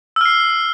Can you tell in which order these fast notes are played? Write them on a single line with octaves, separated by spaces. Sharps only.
E6 F6 C7